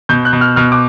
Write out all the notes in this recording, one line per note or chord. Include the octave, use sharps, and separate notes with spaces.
B2 G6
F#6
B2
F6
B2 F6
D6